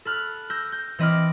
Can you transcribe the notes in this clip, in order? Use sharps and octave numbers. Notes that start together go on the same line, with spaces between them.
A4 B5 F6 F#6
E6 G6 A#6
G6
E3 C4 D#5 B5 D6 F6